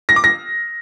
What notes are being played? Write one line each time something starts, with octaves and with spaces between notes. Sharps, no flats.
A#6
D6
A#6